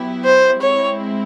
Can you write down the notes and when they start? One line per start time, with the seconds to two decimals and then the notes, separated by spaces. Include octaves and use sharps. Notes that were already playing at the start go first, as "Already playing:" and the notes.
Already playing: F#3 B3 E4 G4
0.25 C5
0.60 G#3 C4 E4 C#5